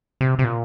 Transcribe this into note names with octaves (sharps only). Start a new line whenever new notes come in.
C3
C3
A#2